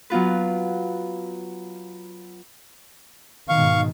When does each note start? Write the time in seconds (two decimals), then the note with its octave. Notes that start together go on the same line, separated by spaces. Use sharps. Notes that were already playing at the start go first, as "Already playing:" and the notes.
0.10 F#3 B3 F4 B4
3.49 G#2 B2 D#3 F5 C#6